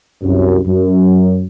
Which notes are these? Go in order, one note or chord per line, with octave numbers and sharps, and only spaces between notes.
C2 F#2
F#2